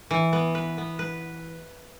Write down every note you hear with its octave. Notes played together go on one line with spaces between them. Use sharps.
E3
B3
B4
B3
B4